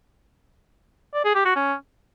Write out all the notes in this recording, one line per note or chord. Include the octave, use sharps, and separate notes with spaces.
D5
G#4
G4
F#4
C#4